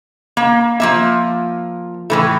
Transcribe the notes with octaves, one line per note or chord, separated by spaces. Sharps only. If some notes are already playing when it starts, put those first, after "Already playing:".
A#3
F3 A#3 E5
A2 E3 A3